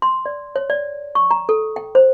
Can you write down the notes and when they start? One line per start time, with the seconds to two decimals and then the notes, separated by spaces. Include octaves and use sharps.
0.02 C6
0.26 D5
0.56 C#5
0.70 D5
1.15 C#6
1.31 A#5
1.49 A4
1.76 G5
1.95 C5